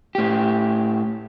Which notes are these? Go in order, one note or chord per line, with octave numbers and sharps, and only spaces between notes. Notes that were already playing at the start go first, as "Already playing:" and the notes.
A2 G4